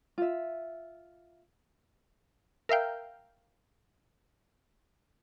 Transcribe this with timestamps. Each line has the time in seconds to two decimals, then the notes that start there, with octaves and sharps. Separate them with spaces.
0.18 F4 E5
2.69 A#4 E5 F5 G5